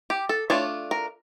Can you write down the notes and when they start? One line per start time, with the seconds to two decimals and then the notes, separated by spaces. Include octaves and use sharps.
0.10 G4
0.29 A4
0.50 A3 D4 F4 C#5
0.91 A#4